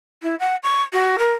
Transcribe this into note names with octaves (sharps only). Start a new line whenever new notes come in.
E4
F#5
C#6
F#4
A#4